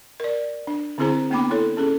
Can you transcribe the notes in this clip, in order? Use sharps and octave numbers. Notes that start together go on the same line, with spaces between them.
A#4 D5
D4
D3 C4 E4 G#4 C5 A#5
A#3 B3 D4 G5 B5 D6
E4 A4 C#5
C#4 G#4 A4